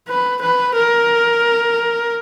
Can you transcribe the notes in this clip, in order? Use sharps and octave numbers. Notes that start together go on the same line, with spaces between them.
B4
B4
A#4